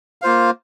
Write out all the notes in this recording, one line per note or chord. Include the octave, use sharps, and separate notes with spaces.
A#3 F4 C5 F5